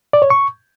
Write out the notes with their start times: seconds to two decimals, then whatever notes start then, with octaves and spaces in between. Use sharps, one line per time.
0.13 D5
0.22 C#5
0.30 C#6